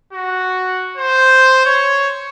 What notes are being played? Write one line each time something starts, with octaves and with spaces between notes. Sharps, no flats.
F#4
C5
C#5